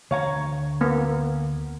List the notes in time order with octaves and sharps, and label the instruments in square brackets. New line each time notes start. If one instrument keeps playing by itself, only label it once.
[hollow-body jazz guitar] D2 F5 A#5 [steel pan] C#5
[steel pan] A#3 B3